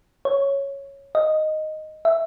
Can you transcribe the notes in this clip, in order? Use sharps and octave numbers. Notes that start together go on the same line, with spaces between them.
C#5
D#5
E5